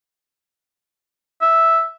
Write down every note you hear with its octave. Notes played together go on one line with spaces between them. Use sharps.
E5